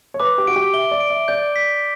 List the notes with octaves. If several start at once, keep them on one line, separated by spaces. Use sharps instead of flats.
C#5
B4 D6
G4
F#4 D7
G4
E5 G7
D5
D7
E5
D5 G6
B6